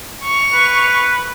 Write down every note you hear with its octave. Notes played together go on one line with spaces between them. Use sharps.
C#6 F7
B4